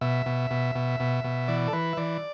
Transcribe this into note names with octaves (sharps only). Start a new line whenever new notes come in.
B2 E5
B2
B2
B2
B2
B2
E3 D5
A4
E3 B4
E5
E3 D5